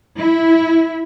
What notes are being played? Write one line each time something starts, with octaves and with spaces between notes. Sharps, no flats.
E4